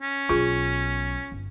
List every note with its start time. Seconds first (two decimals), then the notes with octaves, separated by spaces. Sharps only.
0.01 C#4
0.29 B1 B2 F4 G#4
1.32 G1